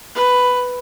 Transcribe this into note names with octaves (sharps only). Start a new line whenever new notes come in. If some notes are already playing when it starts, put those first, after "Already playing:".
B4